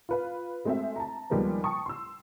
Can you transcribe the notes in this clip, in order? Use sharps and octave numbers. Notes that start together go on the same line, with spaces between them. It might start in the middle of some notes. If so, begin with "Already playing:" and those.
F4 B4 F5
G#3 A3 C4 F#4 E5
A5 A#5
D#2 F3 G3 G#3 A#3 B3
G5 A5 C#6 D#6
C6 E6